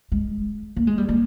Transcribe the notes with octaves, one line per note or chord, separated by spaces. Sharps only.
G#3
A#3
G#3
G3
A#3